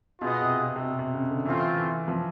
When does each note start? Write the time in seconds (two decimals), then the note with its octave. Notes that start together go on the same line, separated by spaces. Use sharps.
0.21 B2 F4 G#4 B4 D#5 F#5
0.41 C3
0.62 C3
0.76 C3
0.83 B2
0.99 C3
1.14 C#3
1.30 D3
1.45 E3 A3 C4 F4
1.77 E3
2.08 F3